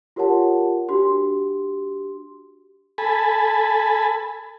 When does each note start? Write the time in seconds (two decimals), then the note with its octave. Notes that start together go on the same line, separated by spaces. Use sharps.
0.16 F4 G4 A#4 C#5 F#5 A5
0.89 D4 F#4 G4 C6
2.98 A4 G#5 A5 B5